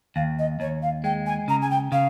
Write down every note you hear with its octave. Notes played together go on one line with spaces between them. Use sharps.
D#2 F5
D#5
D#2 C#5
F5
G#3 G5
G#5
C#3 A#5
G#5
G5
C#3 F5